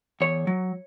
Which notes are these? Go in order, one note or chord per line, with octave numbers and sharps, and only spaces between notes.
E2 C#5
F#3